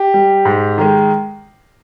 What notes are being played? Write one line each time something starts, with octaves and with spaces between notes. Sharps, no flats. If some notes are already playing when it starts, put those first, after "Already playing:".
Already playing: G4
G3
G#2
D#3 G#3